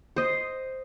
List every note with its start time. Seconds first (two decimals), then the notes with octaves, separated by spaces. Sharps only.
0.16 C5 D#5